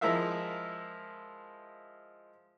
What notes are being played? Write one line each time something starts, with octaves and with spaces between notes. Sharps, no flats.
F3 G#3 E4 A#4 E5 F5